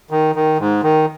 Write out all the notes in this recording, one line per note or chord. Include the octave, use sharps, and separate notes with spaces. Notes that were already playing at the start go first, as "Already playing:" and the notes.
D#3
D#3
G#2
D#3